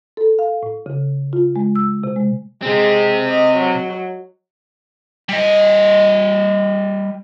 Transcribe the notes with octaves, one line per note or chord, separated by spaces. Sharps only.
A4
F5
A2
C#3
F4
G#3
E6
C3
G#3
C3 G#3 C4
D#5
F#3
G3 D#5